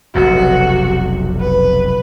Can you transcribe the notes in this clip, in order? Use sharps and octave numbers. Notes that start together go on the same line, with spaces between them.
F1 B1 C3 F#4
B4